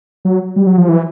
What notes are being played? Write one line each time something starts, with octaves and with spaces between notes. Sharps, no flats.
F#3
G3
F#3
F3
E3